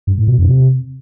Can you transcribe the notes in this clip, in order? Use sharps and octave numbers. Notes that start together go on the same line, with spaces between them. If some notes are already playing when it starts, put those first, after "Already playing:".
G2
A2
B2
F2
C3